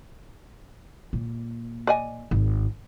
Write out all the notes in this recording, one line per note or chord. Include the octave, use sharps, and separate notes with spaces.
A#2
D5 D#5 G#5
G#1